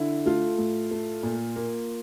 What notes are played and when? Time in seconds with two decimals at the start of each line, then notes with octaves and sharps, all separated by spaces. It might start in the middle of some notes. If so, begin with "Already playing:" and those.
Already playing: D3 E4
0.26 A3 F4
0.58 A2
0.91 A3
1.23 A#2
1.56 A#3